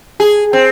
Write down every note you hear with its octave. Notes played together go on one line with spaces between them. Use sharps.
G#4
C4